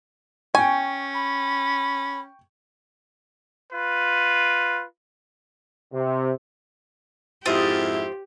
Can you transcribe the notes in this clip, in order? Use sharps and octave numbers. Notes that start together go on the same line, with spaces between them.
C#4 G5 G#5 C#6
B5
F4 B4
C3
F2 G#2 E4 F4 G4 C5 D#6